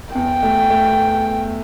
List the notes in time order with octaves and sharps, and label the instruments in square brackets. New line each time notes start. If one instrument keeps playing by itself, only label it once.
[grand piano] E2 [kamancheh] G5
[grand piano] A3
A3